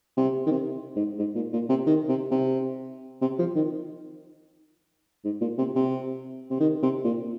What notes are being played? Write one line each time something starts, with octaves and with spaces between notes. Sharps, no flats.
C3
D#3
C3
G#2
G#2
A#2
A#2
C3
D#3
C3
C3
C3
F3
D#3
G#2
A#2
C3
C3
C3
D#3
C3
A#2